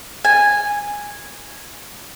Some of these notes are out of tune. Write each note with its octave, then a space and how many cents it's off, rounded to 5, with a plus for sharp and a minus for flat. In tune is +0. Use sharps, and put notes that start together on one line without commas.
G#5 -10